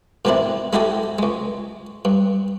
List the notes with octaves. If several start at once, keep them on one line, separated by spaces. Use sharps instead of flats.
G#2 B2 D#3 C4 D4 E4
G#3 E4 F#4 G4 A4
C#2 G#3
G2